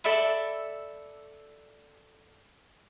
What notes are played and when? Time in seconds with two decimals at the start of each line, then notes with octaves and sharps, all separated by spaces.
0.04 A4 D5 E5 B5